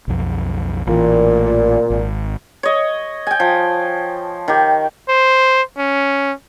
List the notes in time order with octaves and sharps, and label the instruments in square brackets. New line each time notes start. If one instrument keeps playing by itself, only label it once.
[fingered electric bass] B1 F2
[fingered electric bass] A1 E3 [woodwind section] A#2
[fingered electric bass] G#1
[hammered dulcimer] C#5 D#5
G5 G#5
F3
D#3 G4
[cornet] C5
C#4